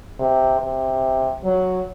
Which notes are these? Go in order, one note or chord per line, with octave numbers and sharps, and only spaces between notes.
C3
C3
F#3